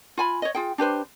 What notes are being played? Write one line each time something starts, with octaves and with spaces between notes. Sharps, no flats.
F4 G#5 B5
C#5 D#5
F4 G#4 G5
D4 G4 B4 C5